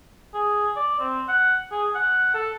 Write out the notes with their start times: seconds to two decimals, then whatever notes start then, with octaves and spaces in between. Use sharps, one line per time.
0.34 G#4
0.76 D5
0.99 C4
1.28 F#5
1.71 G#4
1.95 F#5
2.34 A4